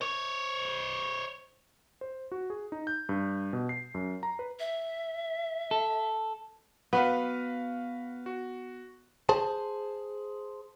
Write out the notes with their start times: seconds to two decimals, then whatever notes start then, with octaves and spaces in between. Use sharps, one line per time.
0.01 C5 C#5
2.01 C5
2.32 F#4
2.50 G#4
2.72 D#4
2.87 G6
3.09 G2
3.53 B2
3.69 C7
3.94 F#2
4.23 A#5
4.39 B4
4.60 E5
5.71 A4
6.93 B3 F#4 B4 F5
8.26 F#4
9.29 G#4 C5 A5